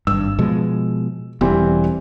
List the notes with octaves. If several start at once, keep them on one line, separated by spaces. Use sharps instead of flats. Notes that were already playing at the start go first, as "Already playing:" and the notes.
G#1 G2 E6
B2 F3 G#3
E1 E3 G3 C4